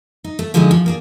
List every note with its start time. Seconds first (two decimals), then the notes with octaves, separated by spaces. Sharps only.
0.24 D#4
0.39 A3
0.54 D3 F3 F#3 G#3 C#4 D#4
0.71 F3
0.86 A#3 D4 G#4